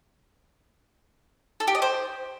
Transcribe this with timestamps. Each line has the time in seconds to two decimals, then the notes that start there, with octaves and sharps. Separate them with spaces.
1.60 A4
1.67 G4
1.75 D#5
1.82 C5